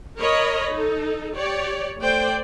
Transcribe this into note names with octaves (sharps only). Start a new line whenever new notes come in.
A#4 C#5 D#5 B5
D#4 A4
G4 C#5 D5
A3 C5 D5 G5